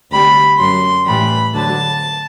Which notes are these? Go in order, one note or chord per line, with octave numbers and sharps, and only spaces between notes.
D2 C3 G3 B5
F#2 F#3 C6
A2 E3 G3 B5
D2 D3 F#3 A5